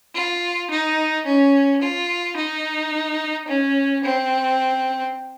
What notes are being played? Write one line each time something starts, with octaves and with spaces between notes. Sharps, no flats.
F4
D#4
C#4
F4
D#4
C#4
C4